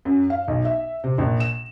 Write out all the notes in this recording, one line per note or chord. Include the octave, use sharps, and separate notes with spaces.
F#2
F5
B1
E5
C3
A#1
E7